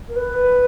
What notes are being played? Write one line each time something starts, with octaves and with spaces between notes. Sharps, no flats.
A#4
B4